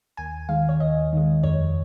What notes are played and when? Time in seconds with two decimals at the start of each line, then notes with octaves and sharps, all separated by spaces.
0.17 D#2 G#5
0.49 D#3 G#3 F5
0.69 C#5
0.80 D#2 D#5
1.13 D#3 G#3
1.43 F2 C#5